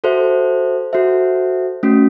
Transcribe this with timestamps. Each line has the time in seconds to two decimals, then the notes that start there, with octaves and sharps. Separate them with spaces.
0.04 F#4 A4 C5 E5
0.93 F#4 A4 C5 E5
1.83 A3 C#4 F#4